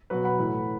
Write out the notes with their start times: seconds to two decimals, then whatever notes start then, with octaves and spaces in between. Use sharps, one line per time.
0.10 B2 F#3 F#4 B4
0.24 F#5 B5
0.39 A2 E3